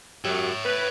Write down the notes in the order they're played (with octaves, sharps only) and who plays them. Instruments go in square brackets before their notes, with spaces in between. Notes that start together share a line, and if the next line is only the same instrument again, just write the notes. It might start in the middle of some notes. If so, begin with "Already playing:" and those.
[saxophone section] F#2 F#3 G4 [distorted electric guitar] C#5 E5
[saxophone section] B4